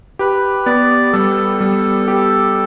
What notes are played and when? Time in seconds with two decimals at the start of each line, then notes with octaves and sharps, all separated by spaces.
0.19 G4 B4
0.66 B3 D5
1.13 G3 A4
1.61 G3
2.08 G4